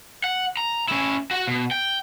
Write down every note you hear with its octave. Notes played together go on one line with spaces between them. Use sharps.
F#5
A#5
C#4 E4
F#4 F#5
B2
G5